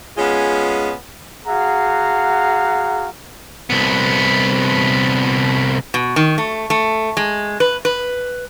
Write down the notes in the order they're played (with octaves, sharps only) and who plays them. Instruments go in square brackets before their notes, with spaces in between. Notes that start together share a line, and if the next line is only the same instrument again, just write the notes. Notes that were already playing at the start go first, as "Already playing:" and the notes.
[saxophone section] G#3 B3 C#4 F4 G#4
[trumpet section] F#4 G#4 F5 F#5 A#5
[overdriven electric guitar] C2 B3
[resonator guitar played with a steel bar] B2
D#3
A3
A3
G#3
B4
B4